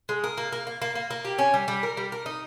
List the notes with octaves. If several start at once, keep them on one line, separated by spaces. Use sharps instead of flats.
G#3
A#4
A#3
A#3
A#3
A#3
A#3
A#3
G4
C#4
G3
G3
A#4
G3
A#4
D#4